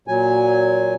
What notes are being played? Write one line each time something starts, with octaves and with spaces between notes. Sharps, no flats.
A#2 F#3 G#5